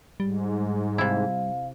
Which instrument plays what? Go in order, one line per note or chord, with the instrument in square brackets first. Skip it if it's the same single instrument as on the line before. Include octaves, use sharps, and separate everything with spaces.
[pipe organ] G#2 [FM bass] G3
[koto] C3 E4 [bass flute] F5